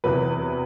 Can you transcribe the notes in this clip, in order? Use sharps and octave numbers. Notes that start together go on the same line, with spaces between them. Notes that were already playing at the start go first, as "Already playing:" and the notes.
E2 C3 F#3 B4